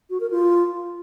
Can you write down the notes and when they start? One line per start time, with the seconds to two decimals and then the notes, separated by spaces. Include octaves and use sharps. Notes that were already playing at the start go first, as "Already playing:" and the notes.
0.10 F#4
0.20 A#4
0.30 F4